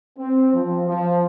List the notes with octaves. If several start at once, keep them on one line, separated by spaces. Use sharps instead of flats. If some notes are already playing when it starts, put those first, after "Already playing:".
C4
F3
F3